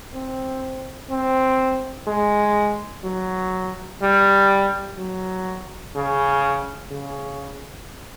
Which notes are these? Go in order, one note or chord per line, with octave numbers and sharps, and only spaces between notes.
C4
C4
G#3
F#3
G3
F#3
C#3
C#3